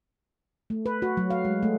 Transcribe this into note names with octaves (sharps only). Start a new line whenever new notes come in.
A3
B4
F#4
F#3
F5
G#3
A3